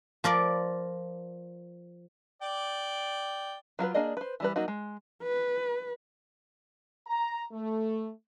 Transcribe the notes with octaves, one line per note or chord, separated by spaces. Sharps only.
F3 A#4 D5
D5 G5
F#3 F4 A#4 B4
A#3 D4 G#4 D5 D#5
B4 C5
E3 G3 B4
F#3 A#3 D#4 F#4
G#3
B4
A#5
A3